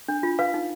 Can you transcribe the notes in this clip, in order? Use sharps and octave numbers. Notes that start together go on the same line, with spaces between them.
D4
F4
B4 F5
D#4